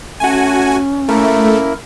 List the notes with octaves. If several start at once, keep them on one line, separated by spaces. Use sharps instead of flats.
A3 C#4 F#4 G#5
A3 A#3 E4 A#4